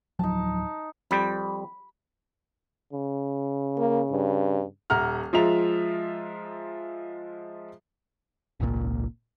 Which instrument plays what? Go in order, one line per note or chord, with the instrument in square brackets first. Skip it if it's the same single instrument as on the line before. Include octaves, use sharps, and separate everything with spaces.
[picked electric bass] D1 F3 F#3 [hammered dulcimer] D#4 A5
[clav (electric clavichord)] F2 G3 G5 [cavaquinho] B5
[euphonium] C#3
[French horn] A#3
G2
[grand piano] D#1 E5 F#5 A#5 F6
F3 G#3 F4 E5 A#5 F7
[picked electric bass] G#1 C#2 A#2